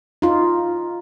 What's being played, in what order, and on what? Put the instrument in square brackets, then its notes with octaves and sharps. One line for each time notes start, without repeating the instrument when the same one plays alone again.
[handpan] D#4 F4